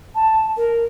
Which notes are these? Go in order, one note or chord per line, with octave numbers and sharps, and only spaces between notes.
A5
A#4